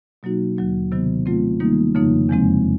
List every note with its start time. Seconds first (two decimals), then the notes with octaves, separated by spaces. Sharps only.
0.23 B2 F#3 A#3 D#4 F#4
0.57 D#2 D3 F#3 A#3
0.92 C3 D#3 F#3 B3
1.26 F#3 A3 C4 F4
1.60 D#3 G3 A#3 D#4
1.95 F2 C#3 F3 A#3 D#4
2.29 E2 C3 F3 G#3 C4